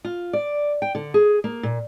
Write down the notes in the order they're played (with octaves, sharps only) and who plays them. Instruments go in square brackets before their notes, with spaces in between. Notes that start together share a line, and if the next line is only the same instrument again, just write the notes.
[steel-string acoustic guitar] F4
D5
G5
D3
G#4
A#3
A#2